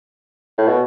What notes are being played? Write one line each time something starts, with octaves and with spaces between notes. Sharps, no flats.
A2
B2